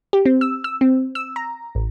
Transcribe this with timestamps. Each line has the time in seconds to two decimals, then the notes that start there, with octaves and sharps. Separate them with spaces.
0.13 G4
0.26 C4
0.41 E6
0.64 E6
0.81 C4
1.15 E6
1.36 A#5
1.75 A1